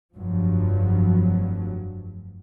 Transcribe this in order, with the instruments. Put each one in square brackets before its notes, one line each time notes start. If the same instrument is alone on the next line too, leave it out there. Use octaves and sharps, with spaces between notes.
[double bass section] F1 G2 F3 F#3